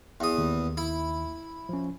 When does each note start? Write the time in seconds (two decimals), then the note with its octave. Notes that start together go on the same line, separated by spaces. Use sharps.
0.20 E2 D#6
0.38 D#2
0.77 E4
1.69 F3 C#4